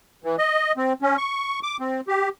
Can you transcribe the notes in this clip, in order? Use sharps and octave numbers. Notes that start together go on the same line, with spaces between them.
E3
D#5
C4
C#4
C#6
D6
C4
G4